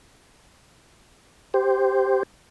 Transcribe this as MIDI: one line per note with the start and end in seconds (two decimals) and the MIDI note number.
1.54 2.23 67
1.54 2.23 72